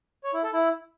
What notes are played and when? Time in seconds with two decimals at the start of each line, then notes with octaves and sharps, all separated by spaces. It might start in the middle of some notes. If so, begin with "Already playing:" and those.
0.24 C#5
0.34 E4
0.43 A4
0.53 E4